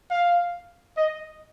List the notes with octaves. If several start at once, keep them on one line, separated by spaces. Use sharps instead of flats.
F5
D#5